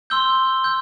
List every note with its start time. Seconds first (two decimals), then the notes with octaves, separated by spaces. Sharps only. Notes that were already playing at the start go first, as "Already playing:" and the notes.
0.10 C6 E6 G6 G7
0.64 E6 G6